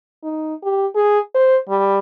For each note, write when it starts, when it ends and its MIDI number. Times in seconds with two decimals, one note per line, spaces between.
0.23 0.54 63
0.63 0.87 67
0.95 1.19 68
1.35 1.57 72
1.69 1.99 55